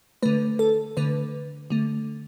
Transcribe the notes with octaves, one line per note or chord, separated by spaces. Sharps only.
D3 A3 B4
A4
D3 A3 B4
D3 A3